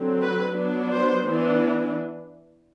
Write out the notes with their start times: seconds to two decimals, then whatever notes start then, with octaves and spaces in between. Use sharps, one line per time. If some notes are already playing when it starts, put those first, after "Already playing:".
Already playing: D3 F#3 C4
0.21 B4
0.56 F#3 B3 D4
0.92 C5
1.25 E3 B3 D4